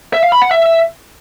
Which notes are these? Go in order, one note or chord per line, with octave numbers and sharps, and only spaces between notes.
E5
F5
B5
F#5
E5